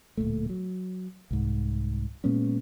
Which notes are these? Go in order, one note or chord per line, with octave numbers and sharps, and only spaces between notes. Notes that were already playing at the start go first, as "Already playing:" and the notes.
D1 D#2 A#2 A3
F#3
C2 G#2
A#2 G#3 B3 C#4